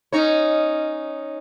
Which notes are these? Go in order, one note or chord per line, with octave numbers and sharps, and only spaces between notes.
C#4 D#4 C#5